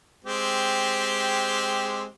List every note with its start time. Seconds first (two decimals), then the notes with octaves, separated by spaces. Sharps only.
0.24 G#3 C4 G4